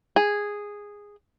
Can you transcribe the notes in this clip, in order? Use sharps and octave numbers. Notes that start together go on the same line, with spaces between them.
G#4